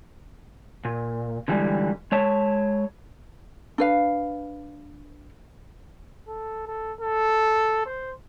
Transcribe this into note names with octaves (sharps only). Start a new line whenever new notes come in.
A#2
D3 E3 G3 G#3
G#3 C#5 A5
D4 B4 F5
A4
A4
A4
C5